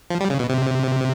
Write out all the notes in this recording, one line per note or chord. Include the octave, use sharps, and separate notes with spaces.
F3
G3
C#3
B2
C3